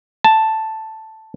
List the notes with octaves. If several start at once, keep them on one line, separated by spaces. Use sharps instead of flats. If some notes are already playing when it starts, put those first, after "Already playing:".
A5